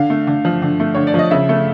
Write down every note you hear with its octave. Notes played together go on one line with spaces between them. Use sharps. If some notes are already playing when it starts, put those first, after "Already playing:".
Already playing: D3 F5
A3
D3
F3
D3
A3
D3 C#5
D5
F3 D#5
C#3 E5
A3